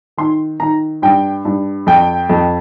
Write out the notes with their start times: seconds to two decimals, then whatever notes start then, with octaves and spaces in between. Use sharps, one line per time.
0.17 D#3 C6
0.60 D#3 A#5
1.02 G2 G5
1.45 G2
1.87 F2 G5
2.29 F2